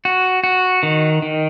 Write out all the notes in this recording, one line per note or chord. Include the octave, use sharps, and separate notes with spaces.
F#4
F#4
D#3
D#3